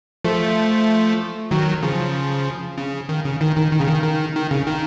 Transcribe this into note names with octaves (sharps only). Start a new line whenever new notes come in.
F3 A3
D#3 F#3
C#3 F3
C#3
D#3
C#3
D#3
D#3
D#3
C#3
D#3
D#3
D#3
C#3
D#3